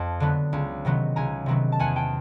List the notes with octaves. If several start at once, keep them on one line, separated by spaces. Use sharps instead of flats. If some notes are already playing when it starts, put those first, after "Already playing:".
Already playing: F2 G5 A5
D3 F#3 B3
C#2
C3 D#3 F#3 B3
C#2 G#5 A#5
C3 D#3 F#3 B3
A5
E2 F#5 G#5
G5 A5